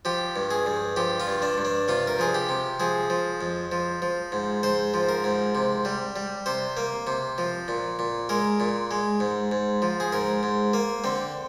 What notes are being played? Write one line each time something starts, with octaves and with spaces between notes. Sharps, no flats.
F3 G4
G2
G#4
G2
F3 G4
F4
G2
D4
G2
D4
C3 F4
A#4
F3 G#4
G4
C3
F3 G#4
F3
F2
F3
F3
G#2
G#2 C5
F3
A#4
G#2
C3
G3
G3
C3 C5
A#3
C3
F3
A#2
A#2
G#3 A#4
A#2
G#3
G#2
G#2
F3
G#4
G#2 A#4
G#2
A#3
D3 C4